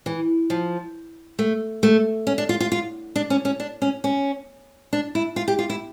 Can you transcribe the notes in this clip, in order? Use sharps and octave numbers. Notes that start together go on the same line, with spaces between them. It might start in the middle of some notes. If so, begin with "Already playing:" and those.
E3
F3
A3
A3
C#4
D4
F4
F4
F4
D4
C#4
C#4
D4
C#4
C#4
D4
E4
F4
G4
F4
E4